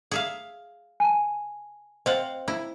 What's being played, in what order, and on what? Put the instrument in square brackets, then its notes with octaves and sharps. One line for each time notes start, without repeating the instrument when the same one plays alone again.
[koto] G#4 E5 F5
[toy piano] G#5 A5
[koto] C4 F5 F#5 [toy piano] D#5
[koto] E4